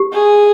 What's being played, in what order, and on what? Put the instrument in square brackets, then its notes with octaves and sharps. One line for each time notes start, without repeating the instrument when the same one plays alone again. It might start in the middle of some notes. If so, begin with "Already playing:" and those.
Already playing: [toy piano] G4
[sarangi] G#4